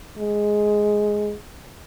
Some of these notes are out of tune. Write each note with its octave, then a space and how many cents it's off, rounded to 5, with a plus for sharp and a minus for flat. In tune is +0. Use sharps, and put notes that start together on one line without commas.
G#3 +5